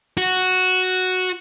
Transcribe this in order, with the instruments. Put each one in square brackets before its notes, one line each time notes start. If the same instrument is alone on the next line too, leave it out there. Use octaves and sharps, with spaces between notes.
[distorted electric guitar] F#4